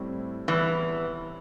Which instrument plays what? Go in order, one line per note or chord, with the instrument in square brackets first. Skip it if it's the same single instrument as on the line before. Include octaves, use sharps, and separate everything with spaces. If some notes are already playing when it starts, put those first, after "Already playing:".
Already playing: [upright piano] A2 G3 C4 E4
[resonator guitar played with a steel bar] E2 E3